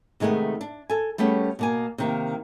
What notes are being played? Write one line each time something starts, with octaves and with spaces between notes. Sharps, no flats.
C3 D#3 G#3 A3 B3
D4
A4 G#5
G3 A3 B3 C#4 G#4
B2 A#3 G#5
C3 D#3 A#3